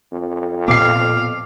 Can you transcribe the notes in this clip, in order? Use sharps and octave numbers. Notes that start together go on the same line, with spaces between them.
F2
A#2 B3 F5 D6 C7